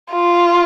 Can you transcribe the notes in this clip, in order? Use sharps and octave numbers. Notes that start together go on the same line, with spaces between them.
F4